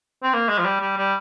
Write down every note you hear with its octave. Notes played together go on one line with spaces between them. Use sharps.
C4
A#3
G#3
F3
G3
G3
G3